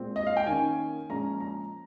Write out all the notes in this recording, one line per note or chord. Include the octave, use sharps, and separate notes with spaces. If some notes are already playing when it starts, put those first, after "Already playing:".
Already playing: A#2 G#3 C4
D#5
F5
G5
D#3 A#3 C#4 G#5
A#2 F3 G#3 C#4 A#5
A#5